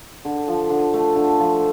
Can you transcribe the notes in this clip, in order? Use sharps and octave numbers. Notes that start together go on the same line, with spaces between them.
D3
F3
D3
A3
D3
F3